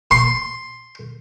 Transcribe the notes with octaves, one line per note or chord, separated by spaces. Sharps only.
C6